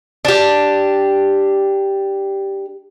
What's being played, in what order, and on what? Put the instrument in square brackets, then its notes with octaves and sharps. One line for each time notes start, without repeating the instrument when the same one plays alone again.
[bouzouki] D4 G4